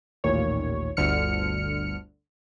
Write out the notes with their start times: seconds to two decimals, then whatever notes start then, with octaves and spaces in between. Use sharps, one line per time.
0.24 A1 D#2 A#2 C#5
0.97 G1 D2 D3 F6 C#7